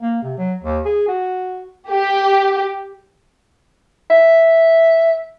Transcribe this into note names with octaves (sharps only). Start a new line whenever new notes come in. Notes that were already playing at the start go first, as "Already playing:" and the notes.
A#3
C3
F#3
D#2
G#4
F#4
G4
E5